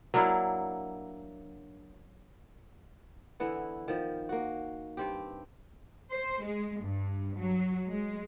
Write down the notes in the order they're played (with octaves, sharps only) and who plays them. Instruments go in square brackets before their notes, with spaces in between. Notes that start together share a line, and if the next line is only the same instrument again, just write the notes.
[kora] F#3 A#3 D4 E4
D3 E3 B3 E4
D#3 F3
A#3 F#4
G2 C4 G4
[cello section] C5
G#3
G2
F#3
G#3